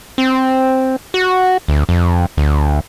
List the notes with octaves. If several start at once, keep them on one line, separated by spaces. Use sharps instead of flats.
C4
F#4
D2
F2
D2